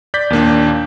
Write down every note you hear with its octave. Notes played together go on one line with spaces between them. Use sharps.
D5 D6 G6 B6
D#2 A#2 A#3 D4